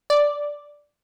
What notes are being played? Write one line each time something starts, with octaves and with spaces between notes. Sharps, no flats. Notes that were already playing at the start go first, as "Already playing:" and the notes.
D5